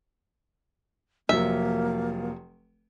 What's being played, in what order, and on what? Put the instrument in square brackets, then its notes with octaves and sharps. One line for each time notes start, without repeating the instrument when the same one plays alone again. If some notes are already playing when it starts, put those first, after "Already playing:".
[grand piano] F1 F3 F#3 [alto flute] A#3 [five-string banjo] E5